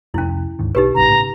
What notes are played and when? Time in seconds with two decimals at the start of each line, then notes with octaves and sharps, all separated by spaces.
0.14 C2 F2 A3 C#4 E4
0.59 D2 G#2 D#3
0.75 B1 D#4 G4 B4
0.95 A#1 F#2 C#3 A#5
1.09 A2 C#3